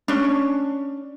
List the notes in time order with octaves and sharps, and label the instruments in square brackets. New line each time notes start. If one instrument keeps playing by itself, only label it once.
[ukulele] C#4 D4